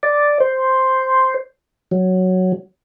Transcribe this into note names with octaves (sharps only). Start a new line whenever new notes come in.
D5
C5
F#3